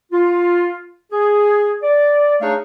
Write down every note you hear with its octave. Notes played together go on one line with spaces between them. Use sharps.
F4
G#4
D5
A3 D4 D#4 G#4 C#5 F5